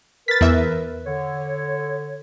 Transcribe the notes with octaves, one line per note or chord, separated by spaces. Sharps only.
A#4 B4 A6 B6
E2 E5
D3 C#5